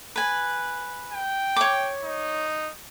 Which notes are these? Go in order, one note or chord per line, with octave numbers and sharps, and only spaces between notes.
B4 G#5
G5
C#5 D6
D#4